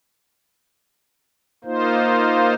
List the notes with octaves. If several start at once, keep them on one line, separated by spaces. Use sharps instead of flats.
A#3 D#4 F4 C5